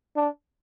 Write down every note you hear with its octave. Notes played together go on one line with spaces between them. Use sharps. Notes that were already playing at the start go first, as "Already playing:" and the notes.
D4